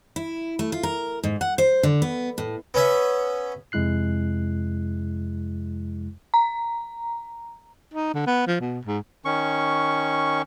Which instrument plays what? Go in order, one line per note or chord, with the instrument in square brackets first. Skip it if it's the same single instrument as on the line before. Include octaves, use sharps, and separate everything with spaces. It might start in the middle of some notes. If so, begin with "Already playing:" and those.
[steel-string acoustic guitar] E4
A3
F4
A#4
G#2
F#5
C5
D3
B3
A2
[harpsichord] B3 C#4 E5
[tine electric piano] F2 C3 G#3 E4 F#6 C7
[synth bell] A#5
[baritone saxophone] D#4
D3
B3
F3
B2
G#2
[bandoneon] D#3 C#4 C#6